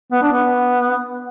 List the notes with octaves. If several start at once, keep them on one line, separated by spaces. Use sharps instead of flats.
B3
D4
B3